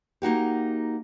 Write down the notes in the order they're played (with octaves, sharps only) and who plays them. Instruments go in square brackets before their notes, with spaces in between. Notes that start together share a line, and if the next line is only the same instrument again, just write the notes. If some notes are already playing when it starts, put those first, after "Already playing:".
[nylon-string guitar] A#3 D#4 F#4 G4